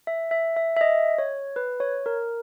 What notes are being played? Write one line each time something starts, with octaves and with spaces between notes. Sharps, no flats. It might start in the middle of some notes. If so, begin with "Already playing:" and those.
E5
E5
E5
E5
D#5
C#5
B4
C#5
A#4